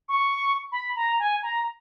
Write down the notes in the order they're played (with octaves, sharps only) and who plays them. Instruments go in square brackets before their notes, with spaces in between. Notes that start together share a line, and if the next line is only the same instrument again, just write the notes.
[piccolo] C#6
B5
A#5
G#5
A#5